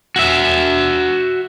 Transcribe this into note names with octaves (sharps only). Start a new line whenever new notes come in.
F#4 E5